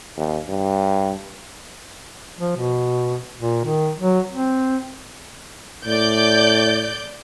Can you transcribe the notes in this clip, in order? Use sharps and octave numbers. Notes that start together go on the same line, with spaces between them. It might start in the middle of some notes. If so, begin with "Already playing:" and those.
D#2
G2
F3
B2
A#2
D#3
F#3
C4
A2 D5 G6